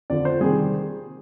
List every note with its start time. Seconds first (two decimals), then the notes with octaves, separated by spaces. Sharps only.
0.10 F2 D3 F3 D5
0.25 C5
0.40 C3 D#3 G3 G#4